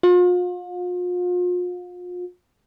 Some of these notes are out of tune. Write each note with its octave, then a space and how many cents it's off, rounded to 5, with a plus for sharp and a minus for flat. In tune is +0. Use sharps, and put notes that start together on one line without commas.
F4 +40